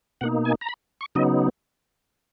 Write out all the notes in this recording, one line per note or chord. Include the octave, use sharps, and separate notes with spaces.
B2 A#3 D#4 F#5
G#5
A#5
B5
C#6
C#3 F#3 B3 D#4 D#5